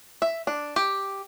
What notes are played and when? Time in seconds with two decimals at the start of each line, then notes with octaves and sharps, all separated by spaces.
0.22 E5
0.47 D4
0.76 G4